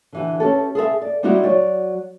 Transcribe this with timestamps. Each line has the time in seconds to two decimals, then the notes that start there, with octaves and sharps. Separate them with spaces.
0.13 D3 E3 G4
0.40 C#4 G4 A4
0.75 G#4 A4 C5 E5
1.02 D5
1.23 G3 C4 D#4 E4 F#4 G4
1.43 F#3 F#4 D5